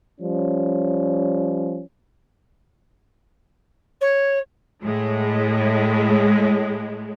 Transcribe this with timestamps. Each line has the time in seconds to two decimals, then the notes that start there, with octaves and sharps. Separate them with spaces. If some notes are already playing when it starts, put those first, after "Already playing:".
0.20 F3 G3 C#4
4.01 C#5
4.83 A2 G#3